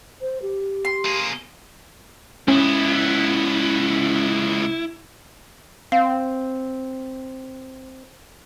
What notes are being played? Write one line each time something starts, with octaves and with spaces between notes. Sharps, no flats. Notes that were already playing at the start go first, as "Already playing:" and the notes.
C5
G4
C6
A#3 G#4
C#2 B3 C#4 E4
C4 F5